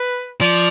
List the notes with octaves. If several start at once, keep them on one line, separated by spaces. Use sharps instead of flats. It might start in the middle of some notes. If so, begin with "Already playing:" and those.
Already playing: B4
F3 D5